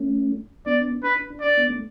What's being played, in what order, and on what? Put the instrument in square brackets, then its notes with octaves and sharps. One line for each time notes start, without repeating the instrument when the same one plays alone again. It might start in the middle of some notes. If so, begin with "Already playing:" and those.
Already playing: [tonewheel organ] A3 C#4
[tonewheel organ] B3 D4 [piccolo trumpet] D5
[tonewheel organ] D4 [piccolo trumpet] B4
[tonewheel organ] D4
[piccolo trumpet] D5
[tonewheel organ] B3 D4
A3